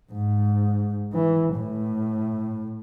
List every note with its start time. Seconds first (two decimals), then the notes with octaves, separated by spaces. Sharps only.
0.13 G#2
1.13 E3
1.55 A2